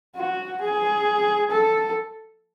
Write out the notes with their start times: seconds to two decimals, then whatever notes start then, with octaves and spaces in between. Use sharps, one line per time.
0.16 F#4
0.61 G#4
1.51 A4